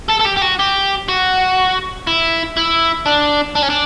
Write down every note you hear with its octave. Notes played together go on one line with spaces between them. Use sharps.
A4
A4
G4
G4
F#4
G4
F#4
E4
E4
D4
D4
C#4
D4